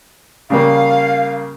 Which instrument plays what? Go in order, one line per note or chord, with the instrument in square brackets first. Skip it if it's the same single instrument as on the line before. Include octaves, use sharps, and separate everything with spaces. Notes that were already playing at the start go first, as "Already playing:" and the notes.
[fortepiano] C#3 G3 A#3 [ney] F5